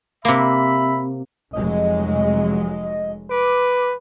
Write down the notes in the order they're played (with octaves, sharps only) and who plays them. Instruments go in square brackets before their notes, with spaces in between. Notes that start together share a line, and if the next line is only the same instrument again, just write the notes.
[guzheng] C3 A#3 [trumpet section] E5 B5
[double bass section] F1 F#3 G#3 [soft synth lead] D#5
[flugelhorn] B4 [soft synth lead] D6